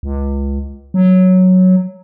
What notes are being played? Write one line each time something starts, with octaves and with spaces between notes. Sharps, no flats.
C#2
F#3